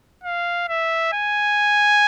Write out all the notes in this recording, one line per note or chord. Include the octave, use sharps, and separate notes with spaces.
F5
E5
G#5